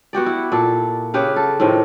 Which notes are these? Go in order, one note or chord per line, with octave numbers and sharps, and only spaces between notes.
B3 F#4 G4 D5
E4
A#2 A4
C#3 G4 B4 F5
A4
A2 C3 D#3 F3